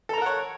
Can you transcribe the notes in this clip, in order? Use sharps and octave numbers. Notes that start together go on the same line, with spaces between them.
A4 A#4 C#5 F#5 A#5